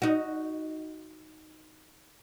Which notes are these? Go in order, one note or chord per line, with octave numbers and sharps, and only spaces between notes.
D#4 F#4